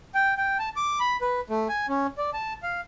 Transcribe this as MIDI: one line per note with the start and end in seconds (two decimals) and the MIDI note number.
0.15 0.34 79
0.37 0.58 79
0.59 0.69 81
0.76 0.99 86
1.00 1.17 83
1.21 1.40 71
1.50 1.68 57
1.69 1.86 80
1.89 2.07 61
2.18 2.30 74
2.34 2.54 81
2.63 2.81 77